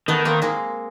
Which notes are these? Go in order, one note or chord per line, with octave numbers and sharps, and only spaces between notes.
D#3 A3 B3
A#3 C4
G#3 A#3